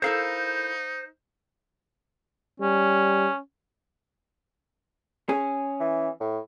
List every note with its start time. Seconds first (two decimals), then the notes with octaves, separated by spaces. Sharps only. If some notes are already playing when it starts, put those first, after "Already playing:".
0.02 D#4 E4 A4 A#4 C5 F5
2.60 G3 C#4
5.29 C#4 G#4
5.80 E3
6.20 A2